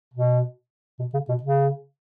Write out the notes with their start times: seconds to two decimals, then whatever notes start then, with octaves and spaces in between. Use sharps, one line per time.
0.14 B2
0.99 B2
1.13 C#3
1.28 B2
1.43 C#3